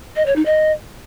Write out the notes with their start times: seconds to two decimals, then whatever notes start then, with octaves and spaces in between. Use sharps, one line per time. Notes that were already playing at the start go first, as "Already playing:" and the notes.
0.16 D#5
0.26 C#5
0.35 D#4
0.45 D#5